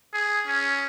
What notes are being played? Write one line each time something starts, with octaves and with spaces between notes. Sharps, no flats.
G#4
C#4